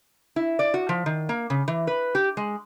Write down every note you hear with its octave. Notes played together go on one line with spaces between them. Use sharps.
E4
D5
F#4
F3
D#3
A#3
C#3
E3
B4
G4
G#3